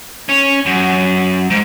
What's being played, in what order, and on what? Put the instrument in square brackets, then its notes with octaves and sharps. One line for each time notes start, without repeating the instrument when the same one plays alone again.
[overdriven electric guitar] C#4
F#2
G#2